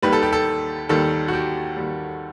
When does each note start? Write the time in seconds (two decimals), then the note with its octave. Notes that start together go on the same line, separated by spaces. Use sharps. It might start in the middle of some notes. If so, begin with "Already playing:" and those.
0.02 D#2 D#3 G3 B4
0.13 A4
0.23 G4
0.33 A4
0.89 D#2 D#3 G3 A4
1.28 F#4
1.33 G4
1.77 D#2 D#3 G3